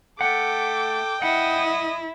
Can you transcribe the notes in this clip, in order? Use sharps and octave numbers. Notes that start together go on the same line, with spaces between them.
A3 A4 F#5 G5 D6
E4 D#5 F#5 D#6